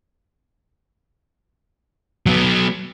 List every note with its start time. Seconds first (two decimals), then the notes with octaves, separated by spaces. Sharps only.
2.26 F#3 B3